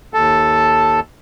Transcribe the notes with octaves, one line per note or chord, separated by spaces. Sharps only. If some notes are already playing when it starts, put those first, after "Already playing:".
D#2 A4 A5